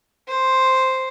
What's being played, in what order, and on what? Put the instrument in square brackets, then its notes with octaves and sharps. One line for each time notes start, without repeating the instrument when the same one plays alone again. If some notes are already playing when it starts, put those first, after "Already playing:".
[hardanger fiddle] C5